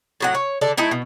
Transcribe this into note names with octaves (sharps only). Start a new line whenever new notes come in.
A2 F#3 F#5
C#5
D3 A4 D5
A3 D#4 E4
B2